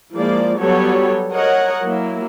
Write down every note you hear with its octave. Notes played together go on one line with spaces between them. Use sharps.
F3 G#3 A#3 E4 D5
F#3 G3 B3 G4 A4 C#5
A#4 C#5 D#5 F#5
F#3 A#3 E4